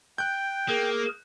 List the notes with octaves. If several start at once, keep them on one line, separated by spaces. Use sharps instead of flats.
G5 F#6 G6
A#3 G#4 A#4